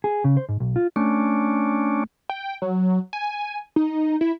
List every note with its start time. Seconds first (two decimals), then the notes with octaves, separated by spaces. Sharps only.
0.04 G#4
0.24 C#3
0.37 C5
0.49 G#2
0.60 B1
0.76 F4
0.96 A3 C#4 D4
2.30 G5
2.62 F#3
3.13 G#5
3.76 D#4
4.21 E4